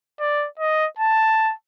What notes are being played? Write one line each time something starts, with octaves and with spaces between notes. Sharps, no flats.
D5
D#5
A5